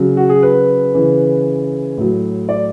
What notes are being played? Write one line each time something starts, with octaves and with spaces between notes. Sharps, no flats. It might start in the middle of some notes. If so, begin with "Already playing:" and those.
Already playing: C#3 F#3
F#4
G#4
B4
C#3 E3
A2 F#3
D5